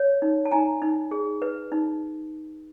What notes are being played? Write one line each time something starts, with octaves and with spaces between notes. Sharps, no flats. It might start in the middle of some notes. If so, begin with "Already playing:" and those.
Already playing: C#5
D#4
A5
D#4 G#5 A#5
D#4
G#4
B4
D#4